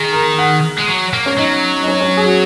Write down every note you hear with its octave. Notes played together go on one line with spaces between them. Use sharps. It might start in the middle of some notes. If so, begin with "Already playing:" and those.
Already playing: D#3 G#4
A#4
F#5
G#3
F#3
A#3
C#4
F#3 D#4
D#4
C#4
C#4
G#4
F#4